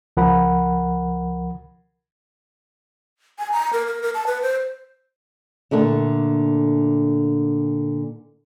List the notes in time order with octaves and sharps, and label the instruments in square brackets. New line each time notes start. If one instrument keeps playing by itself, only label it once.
[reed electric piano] C#2 F3 A#4 F#5 B5
[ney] G#5
A#5
A#4
A#4
A#4
A5
B4
C5
[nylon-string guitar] A#2 D3 A3 D4